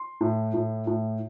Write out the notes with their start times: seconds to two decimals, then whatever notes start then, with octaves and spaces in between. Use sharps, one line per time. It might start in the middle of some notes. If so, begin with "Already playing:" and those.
Already playing: C6
0.21 A2
0.54 A2
0.87 A2